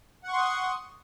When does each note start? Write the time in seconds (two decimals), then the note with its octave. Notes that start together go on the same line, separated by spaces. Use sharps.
0.24 F#5
0.28 C#6
0.33 C6
0.38 D#6